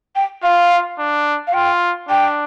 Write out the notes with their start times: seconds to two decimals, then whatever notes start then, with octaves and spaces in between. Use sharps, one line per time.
0.16 G5
0.43 F4 F5
0.99 D4
1.47 F5
1.54 F4 G5
2.09 D4 G5